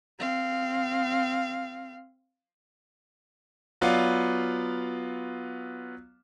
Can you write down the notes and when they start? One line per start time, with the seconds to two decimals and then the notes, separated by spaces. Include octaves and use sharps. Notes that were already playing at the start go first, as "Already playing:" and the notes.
0.19 C4 F5
3.81 F#3 B3 F4 D5 F5